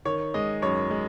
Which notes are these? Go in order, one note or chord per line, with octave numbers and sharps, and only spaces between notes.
D#3 C#5
G#3 D#5
F#2 C#5
G#3